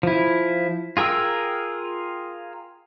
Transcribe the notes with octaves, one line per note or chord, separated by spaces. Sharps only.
F3 E4
F4 G#4 A#4 G5 E6